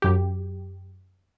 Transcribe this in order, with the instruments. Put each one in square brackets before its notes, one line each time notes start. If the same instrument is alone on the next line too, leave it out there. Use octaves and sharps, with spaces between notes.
[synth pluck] F#2 G4